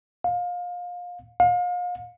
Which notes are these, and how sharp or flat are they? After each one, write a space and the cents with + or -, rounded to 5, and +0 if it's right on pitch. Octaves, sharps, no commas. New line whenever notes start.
F5 +25
F5 +35